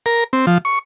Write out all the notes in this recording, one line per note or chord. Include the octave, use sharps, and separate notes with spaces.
A#4
C4
F3
C#6